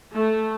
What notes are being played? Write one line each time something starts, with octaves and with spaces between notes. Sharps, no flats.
A3